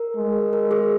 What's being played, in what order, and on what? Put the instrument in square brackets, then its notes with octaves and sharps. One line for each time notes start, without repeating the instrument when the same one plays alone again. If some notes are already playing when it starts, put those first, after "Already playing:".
Already playing: [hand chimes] A#4
[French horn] G#3
[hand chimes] A#4
G#4